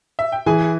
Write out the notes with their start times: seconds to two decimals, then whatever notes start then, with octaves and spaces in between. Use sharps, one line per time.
0.19 E5
0.32 G5
0.46 E3 G#4 G#5